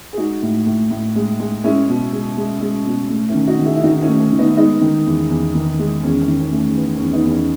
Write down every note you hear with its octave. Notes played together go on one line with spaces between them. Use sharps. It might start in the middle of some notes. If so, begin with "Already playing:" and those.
G#4
G#3 D#4 F#4
A2
A2
A2
G#3
G#3
G#3 C#4 E4
B2
G#3
G#3
G#3
B2
A3
C#4 E4
D#3
D#4 F#4
D#3
E4 G#4
E4
D#3 D#4 F#4
C#4 E4
A3
C#4
D#3
B3 D#4
G#3 B3 D#4
D#3
E2
E2
D#3
G#3
E2 C#4
C#4
D#3
C#4
A3
C#4
E2 B3
C#4
E2
B3 D#4
E2
C#4